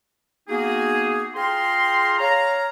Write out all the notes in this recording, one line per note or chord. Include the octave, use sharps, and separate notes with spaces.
A#3 B3 D#4 F#4 G#4
F4 G#4 F5 G5 A#5 C6
C#5 F5 A#5